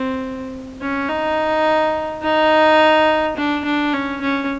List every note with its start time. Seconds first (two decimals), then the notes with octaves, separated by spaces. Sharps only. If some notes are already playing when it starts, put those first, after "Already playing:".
Already playing: C4
0.81 C#4
1.09 D#4
2.23 D#4
3.36 D4
3.64 D4
3.93 C#4
4.21 C#4